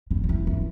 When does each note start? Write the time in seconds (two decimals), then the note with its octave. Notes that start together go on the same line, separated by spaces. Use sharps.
0.11 D3
0.24 D3
0.29 E3
0.47 E3